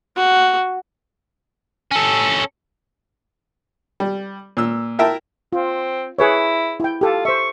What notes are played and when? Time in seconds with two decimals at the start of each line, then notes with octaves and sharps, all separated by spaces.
0.17 F#4
1.91 C#4 A4
4.00 G3
4.57 A#2 E6
4.99 E4 A#4 E5 G5 A5
5.53 C4 F4
6.18 E4 G#4 B4 C#5
6.80 E4 G5
7.01 F4 G4 A4
7.25 C5 E5 C#6